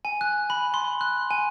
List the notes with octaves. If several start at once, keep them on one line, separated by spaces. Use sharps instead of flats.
G#5
F#6
B5
C6
F#6
G#5